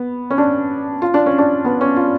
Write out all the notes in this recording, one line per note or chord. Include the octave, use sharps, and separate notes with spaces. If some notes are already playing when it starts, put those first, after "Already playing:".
Already playing: B3
C#4
D4
F4
D4
C#4
D4
B3
C#4
F4